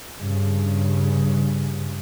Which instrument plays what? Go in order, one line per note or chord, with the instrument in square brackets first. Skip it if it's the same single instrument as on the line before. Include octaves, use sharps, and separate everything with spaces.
[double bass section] G2 C#3